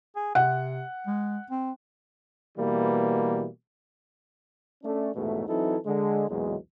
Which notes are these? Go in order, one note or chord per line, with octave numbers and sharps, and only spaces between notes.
G#4
C3 F#5
G#3
C4
B2 E3 G3 A#3
A3 C#4 D4
A#1 E2 G#2 B2 A3
E3 F#3 C4 D#4 E4 A4
D3 G#3
B1 E2 A#2 F#3 G#3